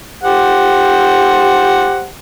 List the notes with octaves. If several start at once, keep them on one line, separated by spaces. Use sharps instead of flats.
G4 C5 F#5